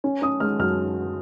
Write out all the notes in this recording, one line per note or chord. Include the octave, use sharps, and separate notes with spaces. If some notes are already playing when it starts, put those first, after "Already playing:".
C#4
C#4 D#6
G#3 F6
F#2 F6